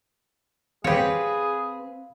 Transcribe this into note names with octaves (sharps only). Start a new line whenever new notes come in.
C4 G4 G#4 B4 C#5 F5